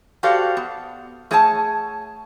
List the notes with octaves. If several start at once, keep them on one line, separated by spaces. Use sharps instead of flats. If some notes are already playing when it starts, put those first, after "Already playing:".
F#4 G4 A4 C5 D5 F5
B3
A3 G#4 C#5 F#5 G#5 A5